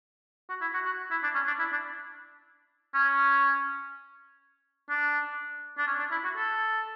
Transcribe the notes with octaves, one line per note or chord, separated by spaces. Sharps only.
F#4
E4
F#4
F#4
E4
D4
C#4
D4
E4
D4
C#4
D4
D4
C#4
D4
E4
F#4
A4